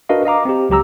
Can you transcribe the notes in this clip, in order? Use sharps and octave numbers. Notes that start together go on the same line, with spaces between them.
D4 F#4 A#4 B4 D#5 F5
D#5 F5 A#5 D6
C4 G4
C#2 F#3 G4 A#5 E6